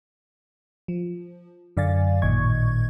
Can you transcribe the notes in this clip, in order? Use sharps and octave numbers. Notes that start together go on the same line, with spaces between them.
F3
F#2 D3 D5 F5 G#5 A6
A1 A#2 D#3 D#5 C#6 G#6